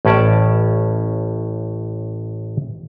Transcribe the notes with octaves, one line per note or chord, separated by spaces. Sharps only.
A1 A2 C#4 D5 A5